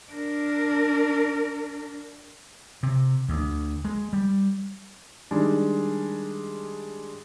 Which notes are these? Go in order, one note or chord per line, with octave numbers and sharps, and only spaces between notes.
D4 A#4
C3
D2
G#3
G3
D#3 G3 G#3 D4